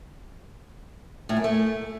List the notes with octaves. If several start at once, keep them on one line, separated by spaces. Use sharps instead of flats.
A2
F#2
A3